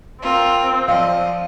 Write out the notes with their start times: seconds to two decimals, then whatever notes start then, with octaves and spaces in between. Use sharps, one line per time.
0.22 C4 F4 A#4
0.89 F3 D5 D#5 F5